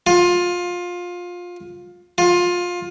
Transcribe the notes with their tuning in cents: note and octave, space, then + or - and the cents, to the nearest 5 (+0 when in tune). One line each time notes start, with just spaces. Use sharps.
F4 +20
F4 +20